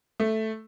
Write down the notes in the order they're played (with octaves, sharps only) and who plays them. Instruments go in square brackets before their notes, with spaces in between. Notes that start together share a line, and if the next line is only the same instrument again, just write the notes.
[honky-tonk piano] A3